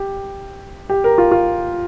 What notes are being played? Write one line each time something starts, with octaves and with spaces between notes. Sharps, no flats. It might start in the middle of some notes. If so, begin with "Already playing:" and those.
Already playing: G4
G4
A#4
F4
F4